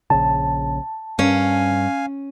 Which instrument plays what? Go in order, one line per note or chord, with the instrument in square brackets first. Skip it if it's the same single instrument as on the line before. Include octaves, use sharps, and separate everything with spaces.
[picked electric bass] A#1 C#3 [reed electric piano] A5
[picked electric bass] G2 [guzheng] C#4 [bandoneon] F5 G#5